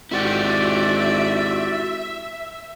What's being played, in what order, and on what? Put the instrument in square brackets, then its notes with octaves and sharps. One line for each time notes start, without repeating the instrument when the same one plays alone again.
[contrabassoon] G#1 [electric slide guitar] E4 F#4 G4 [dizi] D5 [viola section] E5